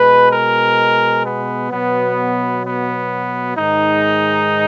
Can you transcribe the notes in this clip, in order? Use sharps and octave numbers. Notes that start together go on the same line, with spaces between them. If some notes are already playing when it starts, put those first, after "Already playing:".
Already playing: B2 G#3 B4
A#4
B3
B2 F#3 B3
B3
G#2 D#3 G#3 D#4